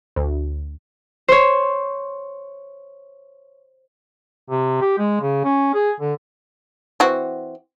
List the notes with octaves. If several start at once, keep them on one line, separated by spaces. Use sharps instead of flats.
D2
C5 C#5
C3
G4
G#3
C#3
C#4
G#4
D3
E3 C4 F#4